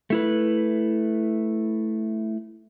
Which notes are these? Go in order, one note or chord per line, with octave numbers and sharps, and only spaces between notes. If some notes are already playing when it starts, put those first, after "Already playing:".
A3 E4 B4